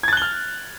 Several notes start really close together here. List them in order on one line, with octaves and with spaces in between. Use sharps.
G#6 A6 F#6 G7 F6